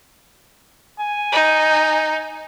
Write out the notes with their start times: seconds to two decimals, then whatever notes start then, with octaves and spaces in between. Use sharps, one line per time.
0.99 G#5
1.32 D#4